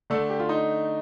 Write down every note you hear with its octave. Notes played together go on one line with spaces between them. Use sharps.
D3 A3 D4 A4
G4
F4
D#4